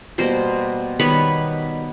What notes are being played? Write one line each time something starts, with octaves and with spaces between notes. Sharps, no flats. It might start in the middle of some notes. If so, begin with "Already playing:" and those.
B2 G3 A#3 A#4 C5
D#3 G3 B3 B4 C#5